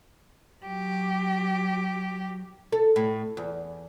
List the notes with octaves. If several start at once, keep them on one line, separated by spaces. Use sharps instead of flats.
F#3 G4
A4
A2
E2